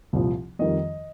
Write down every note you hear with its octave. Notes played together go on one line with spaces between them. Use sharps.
C2 A#2 F3
F2 D#3 G3 D#5